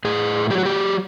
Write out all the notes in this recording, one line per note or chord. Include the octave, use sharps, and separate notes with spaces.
A2 G#4
F#3 G4
F#4
G4